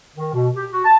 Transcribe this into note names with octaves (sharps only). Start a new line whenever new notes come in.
D#3
B2
G4
F#4
A5